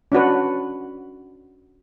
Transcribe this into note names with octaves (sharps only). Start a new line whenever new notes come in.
C#4 D4 F#4 B4